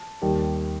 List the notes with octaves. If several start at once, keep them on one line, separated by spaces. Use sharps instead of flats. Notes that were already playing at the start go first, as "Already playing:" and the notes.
Already playing: A5
D#2 D#3 G3